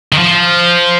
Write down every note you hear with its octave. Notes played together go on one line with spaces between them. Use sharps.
D#3
F3